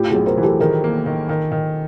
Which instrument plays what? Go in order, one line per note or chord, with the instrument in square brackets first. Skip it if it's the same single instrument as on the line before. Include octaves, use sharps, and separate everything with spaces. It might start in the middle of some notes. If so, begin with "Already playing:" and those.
Already playing: [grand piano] A2 [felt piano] F4 G4
[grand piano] B1 [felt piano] F#4 G#4
[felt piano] A#4 C5
[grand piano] E3
[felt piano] G4 A4
[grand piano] D#3 [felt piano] G#4 A#4
[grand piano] A#3
D#3
D#3
D#3